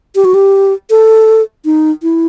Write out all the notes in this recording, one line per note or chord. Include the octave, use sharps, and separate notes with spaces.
G4
F#4
G4
A4
D#4
E4